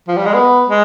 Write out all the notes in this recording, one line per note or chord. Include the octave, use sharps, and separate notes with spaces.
F3
G3
G#3
B3
G#3